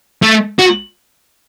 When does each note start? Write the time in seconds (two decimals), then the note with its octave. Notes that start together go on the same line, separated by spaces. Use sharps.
0.22 A3
0.59 F#4